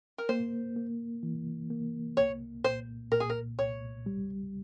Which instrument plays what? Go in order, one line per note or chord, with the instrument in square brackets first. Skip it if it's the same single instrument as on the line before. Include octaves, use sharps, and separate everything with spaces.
[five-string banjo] A#4
[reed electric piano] A#3 [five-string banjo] C5
[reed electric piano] A#3
E3
A#3
[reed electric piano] C2 [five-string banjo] C#5
[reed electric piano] A#2 [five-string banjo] C5
[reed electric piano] A#2 [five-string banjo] A#4
[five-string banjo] G#4
A#4
[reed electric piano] C2 [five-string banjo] C#5
[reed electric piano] G3